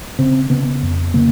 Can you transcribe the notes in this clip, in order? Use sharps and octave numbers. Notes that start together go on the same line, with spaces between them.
C#3 C4
C#3 B3
F2
C#3 A#3